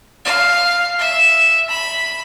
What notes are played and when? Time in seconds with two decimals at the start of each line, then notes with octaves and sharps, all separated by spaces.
0.25 F5
0.99 E5
1.69 B5